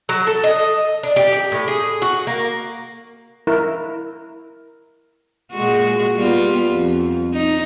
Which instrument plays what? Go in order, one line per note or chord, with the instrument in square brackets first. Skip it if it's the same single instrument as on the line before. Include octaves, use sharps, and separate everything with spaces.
[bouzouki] F#3
A4
D#5
D4
G4
G4
A2
G#4
F#4
A#3
[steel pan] E4 A#4
[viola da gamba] A#2 G#3 F#4
G3 B3 F4
F2
D#4